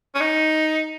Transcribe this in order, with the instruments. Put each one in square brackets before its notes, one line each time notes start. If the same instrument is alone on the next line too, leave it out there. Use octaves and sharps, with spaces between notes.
[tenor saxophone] C#4
D#4